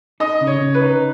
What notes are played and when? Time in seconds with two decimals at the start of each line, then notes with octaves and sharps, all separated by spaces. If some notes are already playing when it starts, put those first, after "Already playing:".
0.20 D#4 D#5
0.41 C#3
0.47 C#5
0.60 C#3
0.74 B4
0.82 D#4